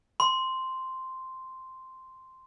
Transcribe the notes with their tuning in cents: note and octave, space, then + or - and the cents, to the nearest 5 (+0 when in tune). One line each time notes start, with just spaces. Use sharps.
C6 -5